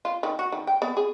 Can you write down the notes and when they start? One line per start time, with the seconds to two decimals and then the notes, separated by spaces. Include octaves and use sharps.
0.05 F4
0.23 D#3
0.39 F#4
0.52 D#3
0.67 G5
0.82 B3
0.97 G#4